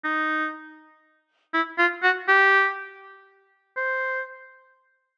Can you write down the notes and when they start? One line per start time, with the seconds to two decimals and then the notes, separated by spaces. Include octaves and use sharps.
0.04 D#4
1.54 E4
1.78 F4
2.03 F#4
2.28 G4
3.77 C5